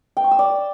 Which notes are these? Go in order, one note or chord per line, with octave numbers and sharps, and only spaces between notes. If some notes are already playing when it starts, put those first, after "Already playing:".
G5
C#6
E6
D5